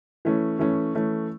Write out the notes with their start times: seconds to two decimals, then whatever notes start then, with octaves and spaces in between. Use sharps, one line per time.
0.25 E3 A3 C#4
0.59 E3 A3 C#4
0.95 E3 A3 C#4